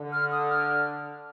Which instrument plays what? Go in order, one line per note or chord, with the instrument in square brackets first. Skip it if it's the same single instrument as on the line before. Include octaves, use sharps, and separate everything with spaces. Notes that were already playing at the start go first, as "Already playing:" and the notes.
Already playing: [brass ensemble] D3
[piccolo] F6
D#6
F6